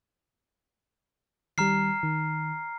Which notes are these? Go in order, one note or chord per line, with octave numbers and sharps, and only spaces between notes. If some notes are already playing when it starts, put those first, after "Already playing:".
D#3 G3 A#5 F6 C7
D#3